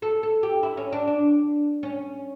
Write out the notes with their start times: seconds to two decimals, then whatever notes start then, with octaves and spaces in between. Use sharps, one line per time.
0.02 A4
0.23 A4
0.43 G4
0.63 E4
0.77 C#4
0.93 D4
1.07 D4
1.83 C#4